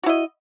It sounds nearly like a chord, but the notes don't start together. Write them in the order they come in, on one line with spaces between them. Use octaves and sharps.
F#4 E4 D#5